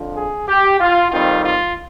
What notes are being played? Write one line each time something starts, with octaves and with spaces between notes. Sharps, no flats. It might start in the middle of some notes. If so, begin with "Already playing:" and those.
Already playing: F2 D3 F3
G#4
G4
F4
F2 D#3 G3 C4 F4
F4